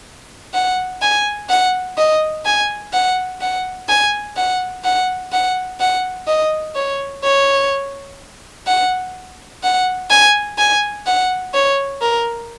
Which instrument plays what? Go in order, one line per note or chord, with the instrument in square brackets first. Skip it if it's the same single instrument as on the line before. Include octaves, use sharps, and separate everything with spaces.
[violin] F#5
G#5
F#5
D#5
G#5
F#5
F#5
G#5
F#5
F#5
F#5
F#5
D#5
C#5
C#5
F#5
F#5
G#5
G#5
F#5
C#5
A#4